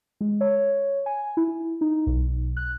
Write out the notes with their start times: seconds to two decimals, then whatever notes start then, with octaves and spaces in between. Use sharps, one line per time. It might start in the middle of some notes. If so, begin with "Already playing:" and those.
0.21 G#3
0.41 C#5
1.06 G#5
1.37 E4
1.81 D#4
2.06 B1
2.57 F#6